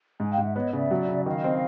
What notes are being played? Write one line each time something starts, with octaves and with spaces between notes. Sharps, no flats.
G#2 G#5
F5 G5
G#2
E5 F#5
B3 C#5 D#5
C#3 D5 E5
F#3
C#3
D#3 D#5 F5
C4